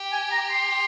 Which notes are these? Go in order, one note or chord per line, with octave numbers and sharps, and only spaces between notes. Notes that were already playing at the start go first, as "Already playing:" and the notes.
Already playing: G4
G#5
A#5
C6